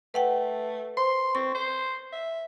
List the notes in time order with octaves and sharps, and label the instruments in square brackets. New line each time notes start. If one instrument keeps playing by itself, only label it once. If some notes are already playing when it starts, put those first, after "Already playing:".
[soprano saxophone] A3 [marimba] B4 F#5 G5
[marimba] C5 [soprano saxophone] C6
[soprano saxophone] C4 [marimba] C#6
[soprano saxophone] C5
E5